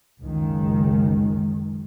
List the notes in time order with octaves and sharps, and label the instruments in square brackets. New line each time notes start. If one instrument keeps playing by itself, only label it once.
[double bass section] F#1 C#2 F#2 D#3 G#3